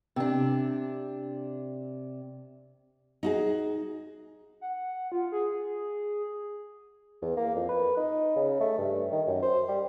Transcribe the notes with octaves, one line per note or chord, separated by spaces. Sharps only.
C3 D4
D#4 F#4 G#4
F#5
F4
G#4
E2
A#3
F2
B4
D#4
C#3
A3
G2
D#3
F#2
C5
G3